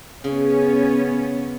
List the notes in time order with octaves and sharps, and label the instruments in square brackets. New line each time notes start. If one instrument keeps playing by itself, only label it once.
[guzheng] C#3 [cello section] B3 C#4